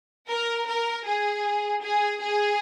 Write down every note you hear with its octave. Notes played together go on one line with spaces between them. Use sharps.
A#4
A#4
G#4
G#4
G#4